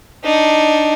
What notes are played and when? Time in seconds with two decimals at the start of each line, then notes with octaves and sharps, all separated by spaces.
0.24 D4 D#4